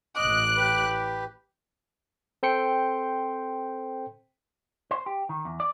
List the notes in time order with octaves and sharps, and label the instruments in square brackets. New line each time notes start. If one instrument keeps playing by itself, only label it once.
[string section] A1 F#6 [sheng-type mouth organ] D#5 [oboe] D6
[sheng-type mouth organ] G4 B4
[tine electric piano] C4 A4 C5 G5 C6 C#7
[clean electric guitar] C5
G4
D#3
E2
D5